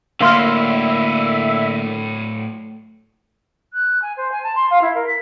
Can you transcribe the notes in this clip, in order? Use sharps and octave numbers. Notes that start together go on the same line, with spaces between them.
A2 D3 F#3 A#3 E5 F5 C6 F6
F#6
G#5
C5
G#5
A5
C6
F5
E4
A#4
B6